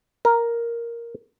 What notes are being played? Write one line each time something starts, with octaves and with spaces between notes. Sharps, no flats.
A#4